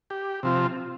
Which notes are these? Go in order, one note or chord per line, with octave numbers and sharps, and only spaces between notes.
G4
C3 F3 C4 F4